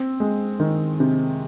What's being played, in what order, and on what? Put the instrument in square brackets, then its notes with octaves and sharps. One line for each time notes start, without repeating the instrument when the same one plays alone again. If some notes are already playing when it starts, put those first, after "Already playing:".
Already playing: [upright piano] C4
G#3
D#3
C3